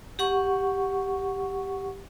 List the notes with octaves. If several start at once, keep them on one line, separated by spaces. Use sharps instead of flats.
G4 F#5 C#6